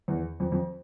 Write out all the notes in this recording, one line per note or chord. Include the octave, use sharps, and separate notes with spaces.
E2
F2
F2